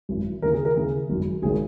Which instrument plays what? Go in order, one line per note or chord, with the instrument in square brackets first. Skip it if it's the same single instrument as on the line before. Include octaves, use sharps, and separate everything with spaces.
[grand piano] G#1 F#2 E3
D#2 C#3 E3 A#4
G#4
A#4
D#2 C#3 E3 G#4
G#1 F#2 D#3 F#3
G#1 D#3 F#3 G#4